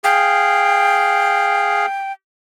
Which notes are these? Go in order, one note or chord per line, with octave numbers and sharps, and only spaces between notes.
G#4 F5 G5